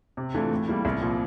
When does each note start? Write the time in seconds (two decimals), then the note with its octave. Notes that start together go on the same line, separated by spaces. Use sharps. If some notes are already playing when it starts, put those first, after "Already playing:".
0.17 C3
0.34 E3 A3 D4 F4
0.51 A2
0.68 G3 A#3 E4
0.85 C2
1.02 A#2 F3